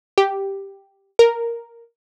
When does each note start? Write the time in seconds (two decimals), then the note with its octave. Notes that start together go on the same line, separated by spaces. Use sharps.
0.18 G4
1.19 A#4